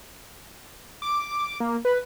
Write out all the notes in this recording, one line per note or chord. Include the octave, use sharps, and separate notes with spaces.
D6
A#3
B4